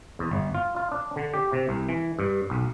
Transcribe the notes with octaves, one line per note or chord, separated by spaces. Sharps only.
E2
G1
F4
F4
D4
D3
G4
C3
C2
E3
G2
B1